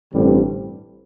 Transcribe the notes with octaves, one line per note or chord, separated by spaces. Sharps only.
A1 G2 D3 G3 C4